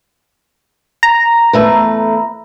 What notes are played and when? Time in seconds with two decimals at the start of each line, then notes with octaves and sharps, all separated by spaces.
1.03 A#5
1.53 E2 A3 B4